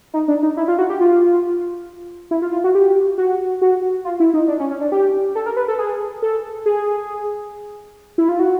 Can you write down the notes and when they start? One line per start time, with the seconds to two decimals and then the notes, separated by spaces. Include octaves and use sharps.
0.14 D#4
0.28 D4
0.42 D#4
0.57 E4
0.68 F4
0.78 F#4
0.90 G4
1.01 F4
2.31 E4
2.42 F4
2.52 F4
2.64 F#4
2.75 G4
3.18 F#4
3.62 F#4
4.05 F4
4.20 E4
4.34 D#4
4.48 D4
4.60 C#4
4.70 C#4
4.81 D4
4.92 G4
5.35 A4
5.46 A#4
5.56 B4
5.68 A4
5.78 G#4
6.22 A4
6.66 G#4
8.18 E4
8.29 F4
8.39 F#4